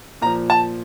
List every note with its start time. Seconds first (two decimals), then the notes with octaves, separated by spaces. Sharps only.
0.22 A#2 A#5
0.26 F3
0.50 A5